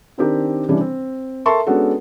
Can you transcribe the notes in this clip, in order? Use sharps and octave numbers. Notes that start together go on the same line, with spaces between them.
D#3 C4 D4 G4 A#4
C3 E3 G3 C#4 D4
C4
A4 A#4 E5 A5 C6 C#6
G#3 B3 C#4 D4 F#4 A4